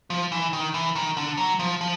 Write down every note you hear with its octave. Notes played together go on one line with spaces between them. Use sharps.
F3
E3
D#3
E3
D#3
D3
F#3
F3
F3